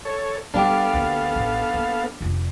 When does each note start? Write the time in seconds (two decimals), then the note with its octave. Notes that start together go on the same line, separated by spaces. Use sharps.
0.05 A4 C#5
0.54 G3 B3 D4 G4 A4 F5
0.93 D2 A#3
1.35 A1
1.74 A#3
2.21 F1 F4